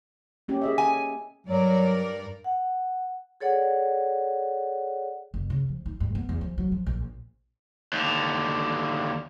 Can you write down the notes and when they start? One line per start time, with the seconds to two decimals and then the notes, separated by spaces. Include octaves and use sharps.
0.48 A#3 C#4 G4
0.61 G#4 D#5 E5
0.78 G#5
1.47 G2 F#3 A#4 D5
2.44 F#5
3.40 G#4 A4 C#5 D5 F#5
5.34 F#1
5.50 C#3
5.69 F3
5.86 D#4
6.00 G2
6.15 B3
6.29 E2
6.41 F3
6.58 F#3
6.72 F3
6.87 A#1
7.93 D#2 D3